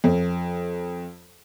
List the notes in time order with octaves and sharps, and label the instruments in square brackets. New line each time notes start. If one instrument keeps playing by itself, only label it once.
[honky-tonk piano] F2